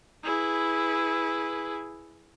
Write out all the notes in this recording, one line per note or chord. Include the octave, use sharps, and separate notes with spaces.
E4 G#4 B4